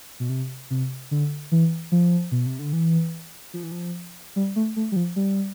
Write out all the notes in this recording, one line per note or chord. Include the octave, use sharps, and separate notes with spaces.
B2
C3
C3
D3
E3
F3
B2
C3
D3
E3
F3
E3
F3
G3
A3
A3
G3
F3
G3